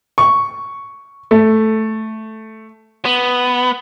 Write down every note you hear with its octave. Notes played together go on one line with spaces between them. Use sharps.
C#6
A3
B3